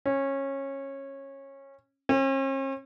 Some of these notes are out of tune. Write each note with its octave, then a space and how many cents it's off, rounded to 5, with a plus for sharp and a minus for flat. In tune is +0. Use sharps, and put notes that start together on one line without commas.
C#4 -20
C#4 -45